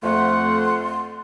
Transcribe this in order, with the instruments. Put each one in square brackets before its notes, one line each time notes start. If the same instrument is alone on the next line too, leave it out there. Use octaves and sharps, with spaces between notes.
[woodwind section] F2 A3 F#5 [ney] C6